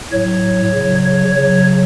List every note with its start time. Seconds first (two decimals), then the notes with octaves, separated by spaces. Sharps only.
0.12 A2 F#3 C#5
0.74 C#3 F#3
1.05 C#5
1.35 C#3 F#3 C#5